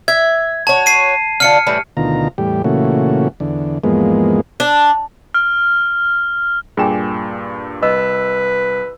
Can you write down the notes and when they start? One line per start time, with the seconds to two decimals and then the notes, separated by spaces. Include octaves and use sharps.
0.08 E5 G#6
0.67 F#4 C#5 A5
0.86 A5 C7 D#7
1.40 D3 F4 F6 C#7
1.67 A2 E3 G3
1.97 D2 B2 D#3 F4 A#5
2.38 E2 A2 G3 G4
2.64 A#2 C#3 E3 A3 F#4
3.40 E2 D3
3.84 E2 G#2 F3 G#3 A#3 B3
4.60 D4
5.34 F6
6.77 G2 A#2 G#4 G5 G#5 E7
7.82 C2 B4 D#5 E6